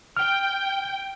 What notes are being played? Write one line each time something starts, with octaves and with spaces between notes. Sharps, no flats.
G5 F6